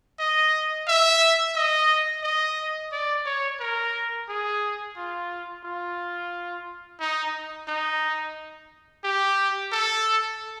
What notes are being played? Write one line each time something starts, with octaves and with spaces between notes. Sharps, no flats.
D#5
E5
D#5
D#5
D5
C#5
A#4
G#4
F4
F4
D#4
D#4
G4
A4